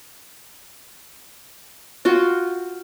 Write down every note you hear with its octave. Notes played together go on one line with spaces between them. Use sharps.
F4 F#4 G5